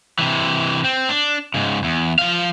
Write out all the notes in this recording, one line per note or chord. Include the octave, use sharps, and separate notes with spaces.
C3 E3
C4
D4
G#2 C#3
E2
F3 F5